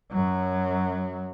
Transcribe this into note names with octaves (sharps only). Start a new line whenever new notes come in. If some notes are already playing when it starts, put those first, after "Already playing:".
F#2 F#3